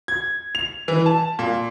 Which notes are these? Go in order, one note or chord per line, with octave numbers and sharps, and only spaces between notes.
G#6
F7
E3
A5
A#2